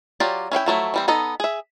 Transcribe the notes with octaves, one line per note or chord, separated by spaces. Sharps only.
F#3 F4 G4 D5
C#4 E4 F5 G5
F3 F#3 A3 E4
E3 G3 C4
B3 D#4 A4 D#5
G#4 E5